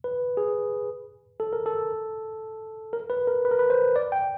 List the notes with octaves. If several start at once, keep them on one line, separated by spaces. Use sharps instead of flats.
B4
G#4
A4
A#4
A4
A#4
B4
A#4
B4
A#4
B4
C5
D5
G5